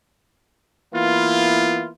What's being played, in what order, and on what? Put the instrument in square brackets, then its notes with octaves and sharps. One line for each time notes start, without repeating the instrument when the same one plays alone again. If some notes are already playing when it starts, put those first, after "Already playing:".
[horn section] E3 A#3 B3 E4 F4